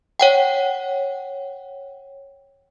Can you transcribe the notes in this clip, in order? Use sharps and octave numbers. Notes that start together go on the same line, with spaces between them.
C#5 F#5 G5